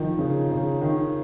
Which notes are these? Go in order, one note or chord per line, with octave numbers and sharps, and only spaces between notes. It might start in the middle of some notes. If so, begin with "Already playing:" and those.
Already playing: D#3 F3
C#3
C#3
D#3